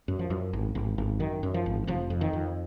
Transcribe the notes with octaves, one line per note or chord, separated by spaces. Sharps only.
F#2
F3
F#2
G#1
G#1
G#1
F#2 D#3
F#2
F3
G#1
F1 F3
F2
D#3
F2